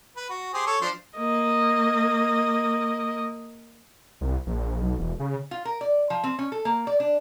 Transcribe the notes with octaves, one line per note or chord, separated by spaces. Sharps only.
B4
F#4
G4 G#4 C5
A4 C#5
F3 D4 C5
A#3 D#5
C2
A#1
B1
E1
C#3
F4
A#4
D5
F3
C4
C#4
A4
A#3
D5
D4